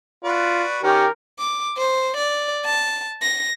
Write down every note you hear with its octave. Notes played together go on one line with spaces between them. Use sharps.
F4 F#4 B4 D5
D#3 C#4 G4 A#4
D6
C5
D5
A5
A#6